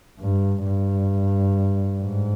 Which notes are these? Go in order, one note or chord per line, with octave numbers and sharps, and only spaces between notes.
G2
G2
G#2